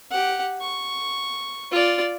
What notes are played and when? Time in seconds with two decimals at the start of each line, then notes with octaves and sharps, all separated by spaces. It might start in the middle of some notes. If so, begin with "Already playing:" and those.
0.11 G4 F#5
0.61 C#6
1.72 F4 D5